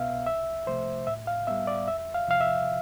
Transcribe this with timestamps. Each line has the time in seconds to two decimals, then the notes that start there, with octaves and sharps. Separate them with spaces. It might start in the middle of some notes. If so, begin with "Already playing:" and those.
Already playing: C2 B2 B3 E5 F5
0.27 C2 E5
0.67 C3 F3 A3 C5
1.07 A2 E5
1.27 F5
1.47 G3 B3 E5
1.67 D5
1.87 E2 E5
2.15 F5
2.28 C3 F3 F5
2.41 E5